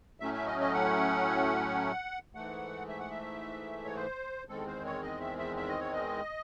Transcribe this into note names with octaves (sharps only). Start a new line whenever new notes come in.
A2 F#3 A3 C#4 E5
E5
D#5
D#5
F#5
G#2 E3 A3 F#5
E5
F#5
E5
C#5
C5
E2 D#3 G#3 C4 A4
C5
C#5
D#5
E5
E5
E5
D#5
C#5
D#5